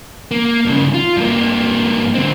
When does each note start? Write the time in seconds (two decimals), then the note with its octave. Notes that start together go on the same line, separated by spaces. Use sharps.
0.31 A#3
0.66 G2 C#3
0.94 F4
1.17 G2 A#3
2.14 D3 C4